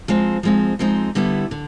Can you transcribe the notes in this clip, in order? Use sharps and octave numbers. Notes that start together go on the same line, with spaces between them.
F3 G#3 C4 D#4
F3 G#3 C4 D#4
F3 G#3 C4 D#4
D3 G3 B3 E4 A4
D3